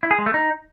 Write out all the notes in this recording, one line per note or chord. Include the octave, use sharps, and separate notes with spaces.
E4
G#4
G#3
A3
D#4